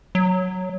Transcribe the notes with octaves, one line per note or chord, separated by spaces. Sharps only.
F#3